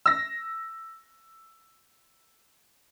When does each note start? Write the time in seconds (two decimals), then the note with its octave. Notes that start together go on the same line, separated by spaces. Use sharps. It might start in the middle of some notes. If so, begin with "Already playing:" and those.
0.06 E6 A#6